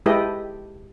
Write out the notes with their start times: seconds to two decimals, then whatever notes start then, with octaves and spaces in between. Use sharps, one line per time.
0.06 G#3 E4 G4 A4 B4 D#5